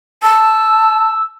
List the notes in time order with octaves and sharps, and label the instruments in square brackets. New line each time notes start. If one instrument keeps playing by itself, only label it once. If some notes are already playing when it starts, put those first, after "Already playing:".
[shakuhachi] A5 [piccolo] E6